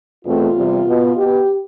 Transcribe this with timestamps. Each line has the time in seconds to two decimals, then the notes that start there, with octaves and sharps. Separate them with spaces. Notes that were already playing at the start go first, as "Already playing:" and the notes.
0.25 E2 B2 A3 C4 F4
0.56 E2 C3 G3
0.86 B2 B3
1.17 B2 B3 G4